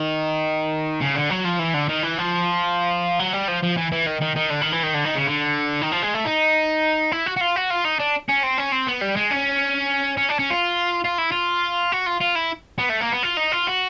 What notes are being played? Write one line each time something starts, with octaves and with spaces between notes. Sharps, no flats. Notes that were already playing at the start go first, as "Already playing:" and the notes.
Already playing: D#3
C#3
D3
F#3
F3
E3
D3
D#3
E3
F3
F#3
G3
F3
F3
E3
E3
D#3
D#3
D#3
D3
D#3
E3
D#3
D3
D#3
C#3
D3
D#3
F3
G#3
A3
D#4
E4
F#4
F#4
F4
F#4
F4
D#4
D4
C#4
C4
C#4
C4
B3
G3
G#3
C#4
C#4
D4
C#4
F4
F4
E4
F4
F#4
F4
F4
E4
B3
A3
A#3
B3
F4
D#4
F4
F#4